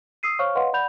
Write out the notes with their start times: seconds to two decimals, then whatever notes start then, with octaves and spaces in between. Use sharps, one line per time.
0.23 D#6 E6 C7 D#7
0.39 C5 C#5 F5 C#6 F6
0.55 B4 C#5 D#5 F5 F#5 C6
0.73 D5 F#5 B5 G6 F7